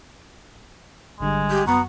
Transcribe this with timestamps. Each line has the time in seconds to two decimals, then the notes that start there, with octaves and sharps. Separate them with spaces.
1.20 G#1 D3 G3 G#3
1.50 G4
1.67 F#2 B3 F#4 A#5